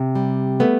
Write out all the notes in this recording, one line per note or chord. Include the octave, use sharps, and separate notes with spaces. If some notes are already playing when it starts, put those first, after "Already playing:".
Already playing: C3
G3
A3 B3